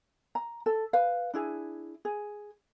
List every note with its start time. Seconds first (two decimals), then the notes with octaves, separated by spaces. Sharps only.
0.35 A#5
0.66 A4
0.93 B4 F5
1.34 D4 E4 G#4
2.05 G#4